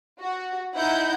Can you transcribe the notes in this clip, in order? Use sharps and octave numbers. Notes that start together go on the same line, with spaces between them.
F#4
D#4 E4 F#5 G6